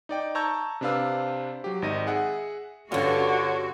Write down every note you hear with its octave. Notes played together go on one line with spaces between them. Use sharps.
D#4 D5 G5
A5 A#5 C#6 E6 G6 G#6
C3 C4 D4 B4 F5 E6
F#3 G4
G#1 D#4 A#6 D#7
G#4 E5 F#5
G2 D3 C#4 F4 F#4 C#5